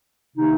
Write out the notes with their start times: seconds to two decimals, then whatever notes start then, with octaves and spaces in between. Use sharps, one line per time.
0.36 C3 D#3 A#3 D#4